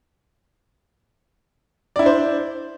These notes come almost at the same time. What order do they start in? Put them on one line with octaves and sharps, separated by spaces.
D5 E4 D4 C5